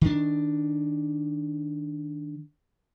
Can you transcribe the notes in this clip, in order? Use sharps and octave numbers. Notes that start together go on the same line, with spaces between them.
D#3 D4